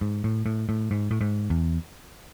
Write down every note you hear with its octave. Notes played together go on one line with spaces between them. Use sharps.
G#2
A2
A2
A2
G#2
A2
G#2
E2